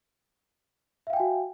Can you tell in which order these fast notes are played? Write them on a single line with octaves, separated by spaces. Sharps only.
E5 F5 G5 G#5 F#4